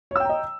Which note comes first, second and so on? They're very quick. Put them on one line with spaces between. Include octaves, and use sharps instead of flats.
C#5 E6 G5 A#5 D#5